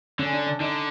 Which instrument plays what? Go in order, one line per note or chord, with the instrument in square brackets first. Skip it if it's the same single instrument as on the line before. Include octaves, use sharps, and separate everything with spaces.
[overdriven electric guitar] D3 [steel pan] C#4
[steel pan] D4
D4
[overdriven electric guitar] D3 [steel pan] D#4